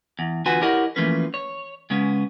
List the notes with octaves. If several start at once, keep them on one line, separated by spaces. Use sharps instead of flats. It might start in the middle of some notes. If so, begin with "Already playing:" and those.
E2
E2 D3 F4 F#4 B4 G#5
E4 G4 A#4 C#5 D#5 F#5
E3 F3 A3 A#3 C#4 B4
C#5
C#3 G#3 B3 C#4